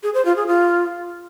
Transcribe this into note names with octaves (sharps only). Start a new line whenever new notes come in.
G#4
C5
F4
G#4
F4